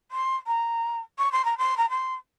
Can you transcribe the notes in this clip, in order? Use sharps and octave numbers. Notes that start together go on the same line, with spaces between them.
C6
A#5
C#6
C6
A#5
C6
A#5
C6